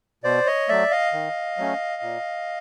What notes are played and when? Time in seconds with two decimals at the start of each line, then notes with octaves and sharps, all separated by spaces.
0.24 B2 C5 D5
0.47 C#5 D#5
0.69 F#3 A3 D5 E5
0.91 D#5 F5
1.13 D#3
1.57 F#3 A3 C#4
2.02 A#2